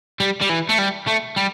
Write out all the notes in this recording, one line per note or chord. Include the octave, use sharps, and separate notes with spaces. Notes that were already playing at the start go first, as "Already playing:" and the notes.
G3
G3
E3
A3
G3
A3
G3